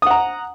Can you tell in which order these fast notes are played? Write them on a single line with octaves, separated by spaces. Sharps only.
D#6 F#5 A#5